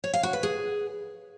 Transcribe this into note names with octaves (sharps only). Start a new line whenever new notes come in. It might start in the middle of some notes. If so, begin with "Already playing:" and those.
C#5
F5
F#4
B4
G#4